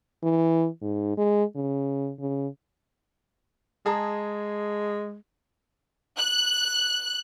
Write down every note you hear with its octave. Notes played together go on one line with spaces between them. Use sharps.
E3
G#2
G#3
C#3
C#3
G#3 G#4 A5 A#5
F#6